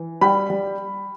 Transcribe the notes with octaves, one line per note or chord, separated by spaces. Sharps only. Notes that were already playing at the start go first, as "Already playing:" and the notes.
Already playing: E3
G3 G5 B5
G3